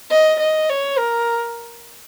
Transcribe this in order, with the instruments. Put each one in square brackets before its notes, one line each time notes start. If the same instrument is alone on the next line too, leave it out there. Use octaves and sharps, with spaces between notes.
[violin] D#5
D#5
C#5
A#4